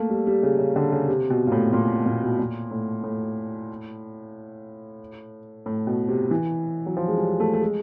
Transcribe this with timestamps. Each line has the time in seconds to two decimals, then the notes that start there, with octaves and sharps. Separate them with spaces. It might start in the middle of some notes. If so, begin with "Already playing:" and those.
Already playing: A3 A#3
0.10 G3
0.27 G3
0.43 C#3
0.59 C#3
0.76 D3
0.92 C#3
1.08 C3
1.30 B2
1.47 A#2
1.52 A2
1.73 A#2
2.06 A#2
2.23 B2
2.39 A#2
2.71 A2
3.04 A2
5.66 A2
5.87 B2
6.08 C3
6.31 E3
6.86 F#3
6.97 F3
7.08 G#3
7.18 G3
7.40 A3
7.53 A3
7.62 G#3